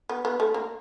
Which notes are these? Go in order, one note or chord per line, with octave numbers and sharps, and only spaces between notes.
B3
B3
A3
A#3